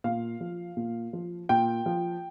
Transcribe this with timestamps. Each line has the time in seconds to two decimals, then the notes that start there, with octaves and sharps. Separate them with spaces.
0.04 A#2 F5
0.41 F3
0.77 A#2
1.13 F3
1.49 A#2 G5
1.86 F3